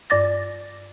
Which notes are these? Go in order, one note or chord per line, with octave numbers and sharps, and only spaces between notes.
G2 D5 D6 A6 A#6